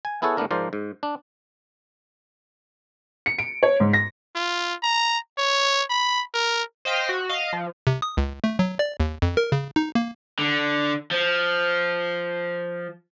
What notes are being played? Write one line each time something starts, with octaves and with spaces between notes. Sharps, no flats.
G#5
B3 E4 G#4 A4 C#5 F#5
A2 A3 B3 D4 A#4
G#2 F3 A#4 C5 D5
G#2
D4
C#7
D7
C#5
G#2
A#6
F4
A#5
C#5
B5
A#4
C5 D#5 F5 G5 F6 B6
F#4
D#5 F5
F3
C3
D#6
C#2
A3
F#3
D5
D#2
F2
A#4
C#3
D#4
A#3
D3
F3